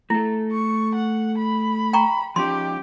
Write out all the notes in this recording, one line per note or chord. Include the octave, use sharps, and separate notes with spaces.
A3 E4 A4
C#6
F#5
B5
G5 A#5 C#6
F3 C#4 D#4 G4 C6